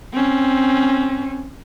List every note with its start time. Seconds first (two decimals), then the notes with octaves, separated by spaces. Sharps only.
0.13 C4 C#4